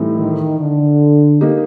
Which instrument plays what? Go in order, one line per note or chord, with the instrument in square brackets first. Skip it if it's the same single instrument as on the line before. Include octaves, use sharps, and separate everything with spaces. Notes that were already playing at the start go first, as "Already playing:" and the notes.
Already playing: [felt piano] A2 E3 G3 C4 D#4
[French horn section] D#3
D3
[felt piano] A#3 D#4 G4